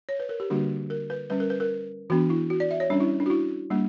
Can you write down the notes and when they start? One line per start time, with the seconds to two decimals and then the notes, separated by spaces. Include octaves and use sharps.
0.09 C#5
0.20 B4
0.29 A#4
0.40 G4
0.50 D3 G3 A#3 D4 F#4
0.90 A#4
1.10 B4
1.30 G3 C#4 B4
1.40 A#4
1.50 B4
1.60 A#4
2.10 E3 B3 D4 F#4
2.30 E4
2.50 F#4
2.60 D5
2.71 E5
2.80 C#5
2.90 G3 C#4 D4
3.00 E4
3.20 D4
3.26 F#4
3.30 E4
3.71 G3 A#3 D4